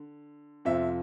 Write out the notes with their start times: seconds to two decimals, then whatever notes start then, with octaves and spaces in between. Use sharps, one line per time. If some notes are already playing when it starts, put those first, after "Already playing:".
Already playing: D3
0.65 F2 C3 F3 C4 F4 E5